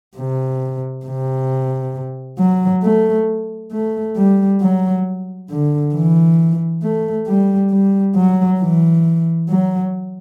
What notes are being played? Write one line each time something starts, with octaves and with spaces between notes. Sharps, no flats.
C3
C3
F#3
A3
A3
G3
F#3
D3
E3
A3
G3
G3
F#3
E3
F#3